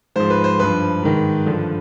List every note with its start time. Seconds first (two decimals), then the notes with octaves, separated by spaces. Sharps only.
0.16 G#2 F3 C5
0.30 B4
0.44 C5
0.59 G2 F3 B4
1.02 G#2 D#3
1.46 G2 D3 F3